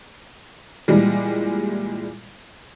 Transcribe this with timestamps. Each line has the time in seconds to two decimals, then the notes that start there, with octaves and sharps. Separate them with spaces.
0.88 A#2 E3 G3 G#3